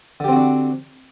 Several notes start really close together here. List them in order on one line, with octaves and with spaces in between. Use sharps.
D3 G4 C4 F#4 D4